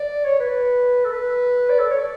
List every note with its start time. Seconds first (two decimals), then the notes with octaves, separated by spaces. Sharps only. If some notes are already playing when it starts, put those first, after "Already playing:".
Already playing: D5
0.25 C#5
0.39 B4
1.05 A4
1.11 B4
1.70 D5
1.79 A4
1.89 C#5
1.99 D5